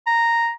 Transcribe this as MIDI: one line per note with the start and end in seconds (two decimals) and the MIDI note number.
0.07 0.50 82